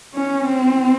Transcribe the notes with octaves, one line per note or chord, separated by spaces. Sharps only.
C#4
C4